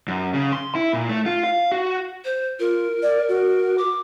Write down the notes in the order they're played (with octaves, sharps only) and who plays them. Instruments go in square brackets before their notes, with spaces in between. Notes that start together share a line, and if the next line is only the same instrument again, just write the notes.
[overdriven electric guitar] F#2
C#3
C6
E4
A#2
A3
F4
F5
F#4
[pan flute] C5
[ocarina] F4 [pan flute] A#4
[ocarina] D5
F#4
[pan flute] D6